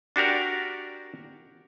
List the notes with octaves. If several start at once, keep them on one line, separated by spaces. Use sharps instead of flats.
D4 F#4 G4 A#4 D5